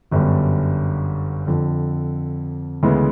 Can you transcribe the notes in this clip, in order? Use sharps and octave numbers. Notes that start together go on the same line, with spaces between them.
G1 F#2 D3 G3
F2 D3 F3
D2 C#3 E3 G#3 B3